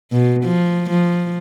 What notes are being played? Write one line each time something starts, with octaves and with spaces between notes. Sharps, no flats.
B2
F3
F3